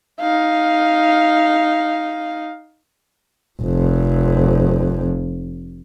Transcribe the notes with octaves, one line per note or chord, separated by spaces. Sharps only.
D#4 F5
F1 F2